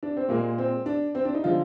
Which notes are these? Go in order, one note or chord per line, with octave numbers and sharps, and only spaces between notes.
D4
C4
A#2 G#3 A#3
C4
D4
C4
D4
D#4
D3 F3 G#3 F4